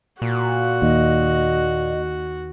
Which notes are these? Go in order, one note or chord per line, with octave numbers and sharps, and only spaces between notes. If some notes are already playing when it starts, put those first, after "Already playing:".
A#2 F#4
D#2 D#5